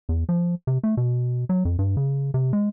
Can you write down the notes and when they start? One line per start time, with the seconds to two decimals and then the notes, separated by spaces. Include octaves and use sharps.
0.09 E2
0.29 F3
0.67 C3
0.83 A3
0.97 B2
1.49 F#3
1.65 F2
1.79 G2
1.97 C#3
2.34 C3
2.53 G#3